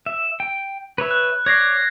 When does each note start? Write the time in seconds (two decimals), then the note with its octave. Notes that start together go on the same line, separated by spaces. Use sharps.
0.06 E5
0.40 G5
0.98 B4 C#5 E5
1.11 F#6
1.46 C#5 D5 G#6 A#6 C7